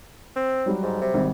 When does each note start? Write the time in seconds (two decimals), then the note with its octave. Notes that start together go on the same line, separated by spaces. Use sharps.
0.36 C4
0.66 F#3 G3 F#4
0.83 G#2
1.01 C3
1.14 G#1 G3